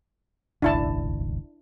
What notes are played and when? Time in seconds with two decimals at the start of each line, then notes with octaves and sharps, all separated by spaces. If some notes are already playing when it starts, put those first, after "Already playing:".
0.62 D#1 G#1 C#2 D4 E4 A5